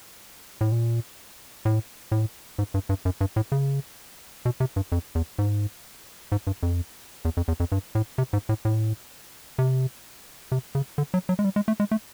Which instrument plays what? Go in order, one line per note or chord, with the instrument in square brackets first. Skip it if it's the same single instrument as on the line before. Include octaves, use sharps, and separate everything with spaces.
[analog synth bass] A2
A#2
A2
A2
G#2
G2
G2
F#2
G2
A2
C#3
B2
C3
G2
F2
E2
G#2
G#2
G2
F2
E2
F2
E2
F2
G2
A2
C3
G#2
A2
A2
C3
C3
C#3
D3
F#3
F#3
G#3
G3
G#3
A3
G#3
A3